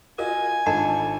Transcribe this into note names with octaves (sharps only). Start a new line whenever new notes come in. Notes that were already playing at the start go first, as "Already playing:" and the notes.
F4 F#4 A#4 D#5 G#5
G#1 D4 F4 A4 D#5 F#5 A5 B5